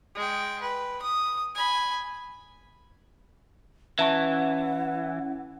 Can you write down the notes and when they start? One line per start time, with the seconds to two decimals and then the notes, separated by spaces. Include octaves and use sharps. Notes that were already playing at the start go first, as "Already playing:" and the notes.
0.15 G#3 G5
0.61 B4
1.02 D#6
1.55 G#5 B5
3.99 E3 C#4 E5 F#5 A5 C#6